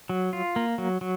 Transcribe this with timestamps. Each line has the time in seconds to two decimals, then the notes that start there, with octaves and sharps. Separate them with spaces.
0.09 F#3
0.33 F4
0.56 A#3
0.78 F#3
1.01 F#3